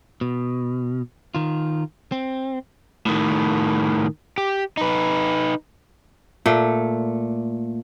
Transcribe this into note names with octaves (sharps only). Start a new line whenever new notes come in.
B2
D#3 F4
C4
A2 D#3
G4
D#4 B4
A#2 A3